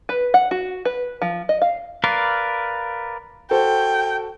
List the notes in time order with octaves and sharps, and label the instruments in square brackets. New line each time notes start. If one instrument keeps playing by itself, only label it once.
[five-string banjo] B4
F#5
F#4
B4
F3
D#5
F5
[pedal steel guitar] A#4 B4 D5 F5
[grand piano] F#4 A4 C5 [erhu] G5